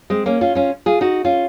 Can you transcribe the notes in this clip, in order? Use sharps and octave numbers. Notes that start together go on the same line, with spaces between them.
G#3 C4
A#3 C#4
C#4 F4
C#4 F4
F4 G#4
D#4 F#4
C#4 F4